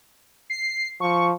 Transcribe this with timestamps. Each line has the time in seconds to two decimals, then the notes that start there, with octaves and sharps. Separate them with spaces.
0.50 C7
1.01 F3 C#6